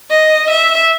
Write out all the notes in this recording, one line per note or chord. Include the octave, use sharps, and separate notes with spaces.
D#5
E5